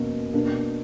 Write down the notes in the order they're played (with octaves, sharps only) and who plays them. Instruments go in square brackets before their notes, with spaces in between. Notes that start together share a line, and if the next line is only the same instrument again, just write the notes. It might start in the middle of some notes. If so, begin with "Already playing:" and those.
Already playing: [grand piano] B2 A#3 C#4
B2 A#3 D4